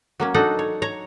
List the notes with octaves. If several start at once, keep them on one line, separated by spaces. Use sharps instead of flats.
F#3 A#3 C#4
D4 D#4 F#4 A4 F#5
C#5
C#5 A#5